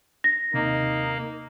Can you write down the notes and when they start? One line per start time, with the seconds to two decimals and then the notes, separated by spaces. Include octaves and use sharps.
0.24 A#6
0.54 D#2 C3 A#3 D#4